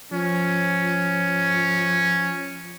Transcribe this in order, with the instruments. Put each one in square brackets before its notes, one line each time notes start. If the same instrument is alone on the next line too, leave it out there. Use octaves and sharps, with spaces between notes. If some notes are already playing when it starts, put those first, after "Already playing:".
[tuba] F3 [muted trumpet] C#4